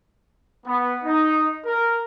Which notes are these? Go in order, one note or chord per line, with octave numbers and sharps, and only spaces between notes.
B3
D#4
A#4